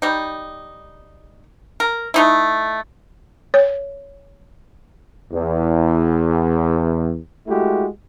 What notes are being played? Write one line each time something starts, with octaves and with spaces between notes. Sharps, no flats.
G3 D#4
A#4
A3 D#4 E4
C#5
E2
G#3 A3 E4 F#4 G4